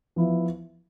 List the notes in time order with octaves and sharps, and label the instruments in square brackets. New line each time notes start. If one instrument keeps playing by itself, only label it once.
[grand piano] F3 B3 E4